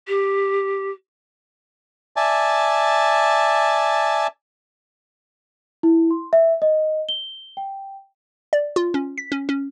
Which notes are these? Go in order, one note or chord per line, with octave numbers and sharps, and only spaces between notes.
G4
D5 E5 G#5 A5
E4
C6
E5
D#5
G7
G5
D5
F4
C#4
B6
C#4
C#4